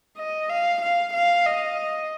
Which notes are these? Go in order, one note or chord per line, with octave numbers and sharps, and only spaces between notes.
D#5
F5
F5
F5
D#5